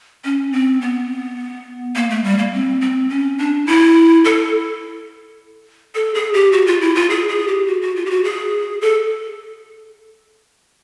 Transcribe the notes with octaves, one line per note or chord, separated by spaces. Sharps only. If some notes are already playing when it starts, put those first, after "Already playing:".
C#4
C4
B3
A#3
A3
G3
A#3
C4
C4
C#4
D4
E4
A4
A4
G#4
G4
F#4
F4
E4
F4
G#4
G#4
G4
F#4
F#4
F4
G4
F#4
G#4
A4